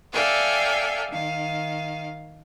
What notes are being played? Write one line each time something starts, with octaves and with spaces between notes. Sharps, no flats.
A4 D5 E5 F5 G5 G#5
D#3 F5